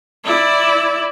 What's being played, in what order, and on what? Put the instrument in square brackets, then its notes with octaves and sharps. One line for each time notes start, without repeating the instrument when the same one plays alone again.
[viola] E4 D5